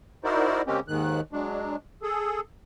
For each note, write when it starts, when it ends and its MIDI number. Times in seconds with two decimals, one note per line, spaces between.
0.24 0.62 63
0.24 0.62 64
0.24 0.62 66
0.24 0.62 70
0.24 0.62 72
0.24 0.62 74
0.67 0.80 49
0.67 0.80 56
0.67 0.80 58
0.67 0.80 60
0.67 0.80 61
0.67 0.80 67
0.88 1.21 39
0.88 1.21 44
0.88 1.21 51
0.88 1.21 90
1.33 1.76 54
1.33 1.76 56
1.33 1.76 62
2.03 2.40 68
2.03 2.40 69